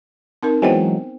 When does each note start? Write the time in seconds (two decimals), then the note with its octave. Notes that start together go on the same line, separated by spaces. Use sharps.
0.43 C4 D#4 A#4
0.62 E3 F#3 G#3 B3 C5 G5